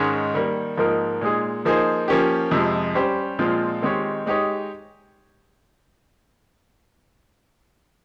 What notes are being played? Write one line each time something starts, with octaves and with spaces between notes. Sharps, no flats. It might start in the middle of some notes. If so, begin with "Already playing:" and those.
Already playing: G#2 D#3 G#3 C#4
D#3 G3 A#3
G#2 F3 A#3 D#4 A#4
A#2 G#3 D#4 G#4
F3 A#3 D#4 G#4 C5
F3 A#3 C#4 G4
F2 C3 F3 G#3
G3 C#4 G4 C5
A#2 F3 G#3 C4 F4
D#3 G#3 C4 G4 C#5
G#3 D#4 G4 C#5